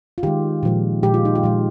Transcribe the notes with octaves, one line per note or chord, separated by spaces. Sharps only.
F4
D#3 G#3 G4
A#2 F3 G#3
A#2 F3 G#3 G4
F4
D#4
F4
A#2 F3 G#3